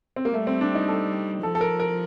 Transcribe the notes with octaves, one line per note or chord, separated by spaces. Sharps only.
C4
A#3
G3 A3
C4
D4
D#4
A4
F3 A4
A4
A#4
A#4